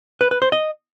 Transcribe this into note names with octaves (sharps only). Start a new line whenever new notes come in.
B4
B4
C5
D#5